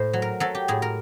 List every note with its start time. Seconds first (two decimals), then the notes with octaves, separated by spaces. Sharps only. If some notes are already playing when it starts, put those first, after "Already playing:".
Already playing: A2 C5
0.13 F#3
0.22 A#4
0.40 F#3 A4
0.55 G4
0.68 A2 G#4
0.82 A#4